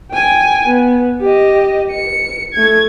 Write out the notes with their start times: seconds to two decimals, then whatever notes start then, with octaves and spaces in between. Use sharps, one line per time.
0.11 G5 G#5
0.67 B3
1.21 G4 D#5
1.91 C#7
2.54 A3 G#6